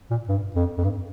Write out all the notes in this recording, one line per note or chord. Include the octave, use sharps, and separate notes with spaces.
A#2
G2
F2
F2
G2